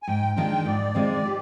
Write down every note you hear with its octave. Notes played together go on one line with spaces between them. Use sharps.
G#5
G#2 G5
D#3 G#3 D4 F4 G5
G#2 D5
D#3 G#3 C4 F4
G4